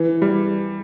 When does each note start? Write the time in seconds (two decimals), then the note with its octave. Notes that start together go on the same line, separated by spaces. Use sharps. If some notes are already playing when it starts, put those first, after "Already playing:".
Already playing: E3
0.22 G3